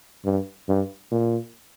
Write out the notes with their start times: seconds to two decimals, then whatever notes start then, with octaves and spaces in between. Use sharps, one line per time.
0.25 G2
0.69 G2
1.12 A#2